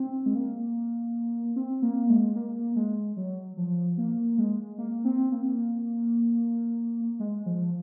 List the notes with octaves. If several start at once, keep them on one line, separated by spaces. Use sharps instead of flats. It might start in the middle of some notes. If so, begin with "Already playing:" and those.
Already playing: C4
G#3
A#3
C4
A#3
G#3
A#3
G#3
F#3
F3
A#3
G#3
A#3
C4
A#3
G#3
F3